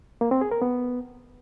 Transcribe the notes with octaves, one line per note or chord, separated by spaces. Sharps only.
A#3
C4
G#4
A#4
B3